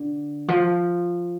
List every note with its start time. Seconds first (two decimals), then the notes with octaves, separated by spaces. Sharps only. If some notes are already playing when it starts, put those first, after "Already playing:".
Already playing: D3
0.48 F3